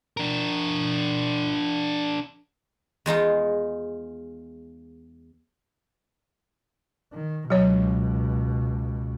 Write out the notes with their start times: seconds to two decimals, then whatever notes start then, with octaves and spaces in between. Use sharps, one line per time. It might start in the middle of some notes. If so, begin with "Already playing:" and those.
0.17 D4 A#4
3.06 E2 G#3 D#4 F4
7.13 D#3
7.50 C#2 B2 F#3 C#5